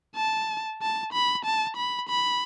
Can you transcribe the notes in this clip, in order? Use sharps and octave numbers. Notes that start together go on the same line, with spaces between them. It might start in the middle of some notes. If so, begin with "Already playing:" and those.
A5
A5
B5
A5
B5
B5